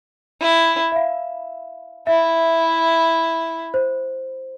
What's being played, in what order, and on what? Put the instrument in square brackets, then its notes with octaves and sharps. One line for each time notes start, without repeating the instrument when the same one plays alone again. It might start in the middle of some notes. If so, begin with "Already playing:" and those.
[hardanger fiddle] E4
[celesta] E5
F5
[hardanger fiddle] E4 [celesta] E5
[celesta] C5